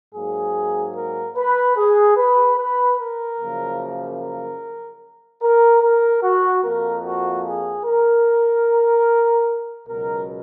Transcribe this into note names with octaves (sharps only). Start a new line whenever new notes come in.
G#2 F#3 A#3 G#4
A#4
B4
G#4
B4
B4
A#4
F#2 C#3 F3 A#3
A#4
A#4
A#4
F#4
F2 F3 A#3 A#4
F#4
G#4
A#4
C#2 B2 F#3 A#4